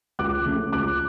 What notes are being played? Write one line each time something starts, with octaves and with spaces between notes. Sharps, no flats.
C#2 D6 F#6
C#3 F3 A3
C#2 D6 F#6